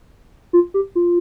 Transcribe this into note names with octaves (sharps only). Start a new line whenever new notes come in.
F4
G4
F4